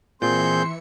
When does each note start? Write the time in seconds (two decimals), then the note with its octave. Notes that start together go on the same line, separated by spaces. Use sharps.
0.22 A#2 E3 C4 G#4 E5 C6 G6 C#7